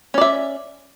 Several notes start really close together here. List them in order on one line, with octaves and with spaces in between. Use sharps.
C#4 D5 E5